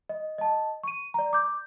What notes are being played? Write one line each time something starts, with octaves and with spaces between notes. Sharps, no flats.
D#5
D#5 A5
C#6 D#7
D5 A#5
D6 G6